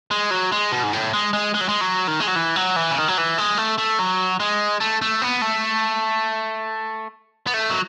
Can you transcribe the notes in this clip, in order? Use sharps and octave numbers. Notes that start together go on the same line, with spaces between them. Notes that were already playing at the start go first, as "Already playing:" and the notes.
G#3
F#3
G#3
B2
G#2
A2
G#3
G#3
G#3
F#3
G#3
F#3
D#3
G#3
F#3
E3
F#3
E3
C#3
D#3
F#3
E3
G#3
A3
A3
F#3
G#3
A3
A3
B3
A3
B3
A3
F#3